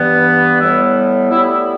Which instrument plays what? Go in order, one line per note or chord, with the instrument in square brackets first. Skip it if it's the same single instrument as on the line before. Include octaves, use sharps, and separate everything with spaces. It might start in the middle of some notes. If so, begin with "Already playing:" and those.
Already playing: [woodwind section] G2 E3 B3
A2 G3 B3 E4
A2 G3 B3 E4